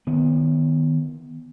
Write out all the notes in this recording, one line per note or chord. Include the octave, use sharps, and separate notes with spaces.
D#3 B3